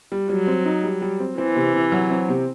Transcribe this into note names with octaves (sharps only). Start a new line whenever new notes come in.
G3
F#3 G3
C4
D#4
G3
G3
C4
E3 C4
C3
C3
F#3
C4
C3